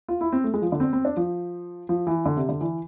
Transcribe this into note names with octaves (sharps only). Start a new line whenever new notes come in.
F4
E4
C4
A3
G#3
F3
D3
C4
C4
D4
F3
F3
E3
D3
C3
D3
E3